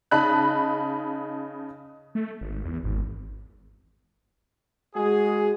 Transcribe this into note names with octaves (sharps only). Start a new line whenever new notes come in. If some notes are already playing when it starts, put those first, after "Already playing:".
C#3 D#4 A5 B5 F#6
A3
G#1
E2
G#1
G#3 F#4 G#4